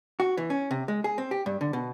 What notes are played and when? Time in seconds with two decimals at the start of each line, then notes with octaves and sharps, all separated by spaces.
0.20 F#4
0.37 E3
0.50 C#4
0.71 C3
0.88 G#3
1.04 G#4
1.18 C4
1.31 G4
1.46 G2
1.61 D3
1.73 B2